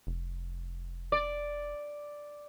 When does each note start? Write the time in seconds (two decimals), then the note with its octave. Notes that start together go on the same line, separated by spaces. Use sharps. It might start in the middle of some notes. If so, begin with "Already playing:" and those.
0.07 F1
1.12 D5